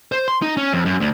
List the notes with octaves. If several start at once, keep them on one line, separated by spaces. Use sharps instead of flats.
C5
C6
D#4
C#4
F2
F#2
D2